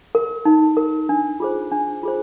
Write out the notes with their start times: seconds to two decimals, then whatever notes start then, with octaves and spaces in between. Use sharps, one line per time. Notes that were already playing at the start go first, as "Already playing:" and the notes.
0.15 A#4
0.45 D#4
0.77 A#4
1.09 D4
1.40 F4 G#4 C5
1.71 D4
2.03 F4 G#4 C5